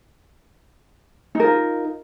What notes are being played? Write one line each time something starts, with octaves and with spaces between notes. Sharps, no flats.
D#4 F4 A#4